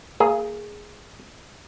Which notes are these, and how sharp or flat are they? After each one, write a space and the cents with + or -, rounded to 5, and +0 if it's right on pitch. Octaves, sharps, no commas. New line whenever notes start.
A#3 -25 G#4 +0